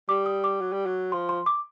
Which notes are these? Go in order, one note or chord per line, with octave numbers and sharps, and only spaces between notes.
G3 D6
D#6
D6
F#3
G3
F#3
F3 C6
C6
D6